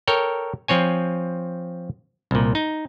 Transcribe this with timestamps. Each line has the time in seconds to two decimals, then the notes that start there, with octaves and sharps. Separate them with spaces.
0.07 A4 A#4 C#5 G5
0.68 F3 C4 C#5 G#5
2.31 C2 A#2
2.55 D#4